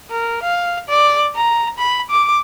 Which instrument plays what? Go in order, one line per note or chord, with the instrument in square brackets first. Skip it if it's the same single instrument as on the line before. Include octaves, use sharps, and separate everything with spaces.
[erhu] A#4
F5
D5
A#5
B5
D6